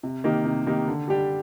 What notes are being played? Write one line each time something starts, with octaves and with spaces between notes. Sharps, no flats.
C3
D#3 A#3 D#4 G4
C3
D#3 A#3 D#4 G4
D3
G3 D4 G4